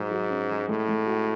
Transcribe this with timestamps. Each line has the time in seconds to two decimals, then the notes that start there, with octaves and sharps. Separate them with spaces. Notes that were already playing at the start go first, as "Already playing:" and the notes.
Already playing: G#2 F#3
0.11 F#3
0.30 C#4
0.49 F#3
0.69 A2 G#3
0.88 G#3
1.07 F#4